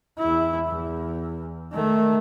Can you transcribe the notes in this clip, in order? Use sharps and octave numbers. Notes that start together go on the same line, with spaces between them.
E2 E4
E2
D#3 A3